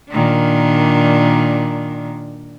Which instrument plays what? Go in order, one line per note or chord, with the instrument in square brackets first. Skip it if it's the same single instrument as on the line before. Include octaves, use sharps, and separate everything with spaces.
[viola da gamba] A#2 D#3 D4